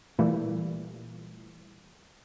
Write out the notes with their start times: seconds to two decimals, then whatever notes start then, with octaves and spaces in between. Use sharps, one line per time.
0.19 A#2 E3 G3 A3